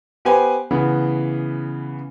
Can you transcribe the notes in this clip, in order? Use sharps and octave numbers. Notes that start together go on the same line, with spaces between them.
B3 G4 B4 C5 G#5
C#3 E3 B3